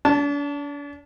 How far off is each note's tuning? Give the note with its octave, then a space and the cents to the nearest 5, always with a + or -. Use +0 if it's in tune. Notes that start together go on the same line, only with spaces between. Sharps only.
D4 -40 A5 +0